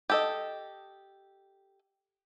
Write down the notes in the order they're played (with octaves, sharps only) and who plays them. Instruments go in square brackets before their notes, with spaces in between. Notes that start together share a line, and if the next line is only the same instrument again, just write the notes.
[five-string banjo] G4 A4 D#5